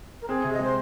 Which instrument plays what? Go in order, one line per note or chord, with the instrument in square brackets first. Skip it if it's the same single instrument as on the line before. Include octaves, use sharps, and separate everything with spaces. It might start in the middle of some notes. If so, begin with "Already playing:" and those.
[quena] A#4
[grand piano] C4 [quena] G#4
[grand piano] C3
[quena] D#5
[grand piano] G#3
[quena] C5